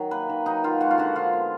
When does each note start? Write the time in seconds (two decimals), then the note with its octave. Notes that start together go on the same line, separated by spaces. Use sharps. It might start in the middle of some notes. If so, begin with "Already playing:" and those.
Already playing: D#3 F#3
0.11 A#3 B4
0.29 D#3
0.46 F#3 D#4
0.64 D#3 F4
0.81 G#3 F#4
0.91 F4
0.98 D3 F#4
1.16 F3 F4
1.33 B3